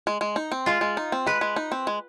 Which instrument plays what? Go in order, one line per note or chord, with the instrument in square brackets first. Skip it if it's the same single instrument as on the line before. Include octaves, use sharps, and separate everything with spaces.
[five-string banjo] G#3
G#3
D#4
C4
[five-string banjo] G#3 [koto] F4
[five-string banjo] G#3
D#4
C4
[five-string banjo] G#3 [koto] B4
[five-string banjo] G#3
D#4
C4
G#3